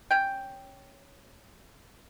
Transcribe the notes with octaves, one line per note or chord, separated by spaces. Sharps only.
C#4 G5